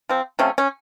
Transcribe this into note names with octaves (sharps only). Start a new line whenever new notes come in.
F3 C4
C3 F3 A3 C#4
C#4